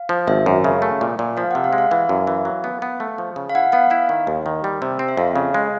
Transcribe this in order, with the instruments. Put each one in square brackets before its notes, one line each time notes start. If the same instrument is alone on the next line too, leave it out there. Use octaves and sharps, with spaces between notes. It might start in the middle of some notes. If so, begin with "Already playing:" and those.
Already playing: [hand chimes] F5
[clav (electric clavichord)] F3
[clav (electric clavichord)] G#1 [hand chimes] E5
[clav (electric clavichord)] F#2
C#3
A3
A#2
A#2
[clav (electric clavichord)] F3 [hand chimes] F5
[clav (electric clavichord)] C3 [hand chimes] F#5
[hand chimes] F5
[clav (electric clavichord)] G#3
[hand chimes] F5
[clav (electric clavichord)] E3 [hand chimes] F5
[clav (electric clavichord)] F#2
E3
F#3
B3
B3
A3
F3
C#3
[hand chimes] F5
[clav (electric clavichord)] E4 [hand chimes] F#5
[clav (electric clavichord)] B3 [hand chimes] F5
[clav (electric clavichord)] E4 [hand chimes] F5
[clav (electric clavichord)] D#3
D#2
D#3
G3
C3
C4
[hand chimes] E5
[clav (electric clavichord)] F2 [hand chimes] F5
[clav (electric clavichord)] C#3
G#3